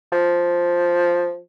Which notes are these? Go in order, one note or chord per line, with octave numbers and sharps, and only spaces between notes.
F3